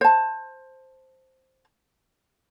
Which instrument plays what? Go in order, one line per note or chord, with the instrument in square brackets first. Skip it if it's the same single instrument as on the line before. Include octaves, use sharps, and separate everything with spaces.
[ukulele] C5 A5